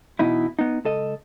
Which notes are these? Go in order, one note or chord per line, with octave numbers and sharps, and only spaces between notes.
B2 E3 D#4 E4
B3 D#4
C#2 A4 D#5